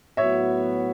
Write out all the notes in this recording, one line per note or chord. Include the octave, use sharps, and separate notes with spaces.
A2 F#3 B3 F#4 C#5 E5